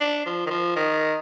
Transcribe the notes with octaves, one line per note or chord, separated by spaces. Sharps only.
D4
F3
D#3
F3
D#3